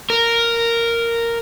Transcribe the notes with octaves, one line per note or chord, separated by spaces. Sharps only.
A#4